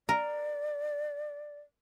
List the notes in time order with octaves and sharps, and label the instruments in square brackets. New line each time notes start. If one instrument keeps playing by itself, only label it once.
[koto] A#4 [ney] D5